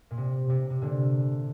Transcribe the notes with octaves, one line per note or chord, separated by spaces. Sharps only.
A#2
C3
C3
C3
A#2 D3